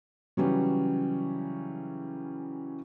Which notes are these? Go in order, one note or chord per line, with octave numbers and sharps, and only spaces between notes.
C#3 E3 F#3 G3 C#4